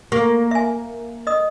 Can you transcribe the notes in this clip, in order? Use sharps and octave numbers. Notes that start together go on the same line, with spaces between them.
A#3 G4
E5 G#5
D#5 D#6